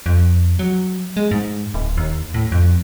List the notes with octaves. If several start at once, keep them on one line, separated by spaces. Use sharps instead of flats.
F2
F#3
G#3
G#2
D1
D#2
A2
F2